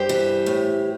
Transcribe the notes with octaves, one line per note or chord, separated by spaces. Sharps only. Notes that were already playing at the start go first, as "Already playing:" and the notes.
Already playing: G2 G4 C5
E3
A2